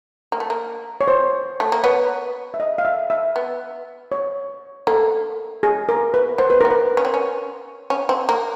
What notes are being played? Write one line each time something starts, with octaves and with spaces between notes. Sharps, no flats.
A#3
A3
A#3
C#5
C5
A3
A#3
B3 C#5
E5
D#5
F5
E5
E5
B3
C#5
A#3 A4
G#4
A#4
B4
B3 C5
B4
B3 A#4
B4
C#4
C4
C#4
C#4
C4
A#3